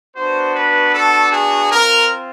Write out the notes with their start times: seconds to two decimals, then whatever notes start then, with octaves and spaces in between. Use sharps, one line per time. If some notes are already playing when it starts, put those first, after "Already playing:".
0.15 B3 D4 F#4 C5
0.54 B4
0.92 A4
1.31 G#4
1.70 C4 F4 A#4